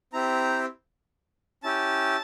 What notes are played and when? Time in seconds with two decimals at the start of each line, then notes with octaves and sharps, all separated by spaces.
0.13 C4 E4 G4 A#5
1.63 C#4 E4 G4 A5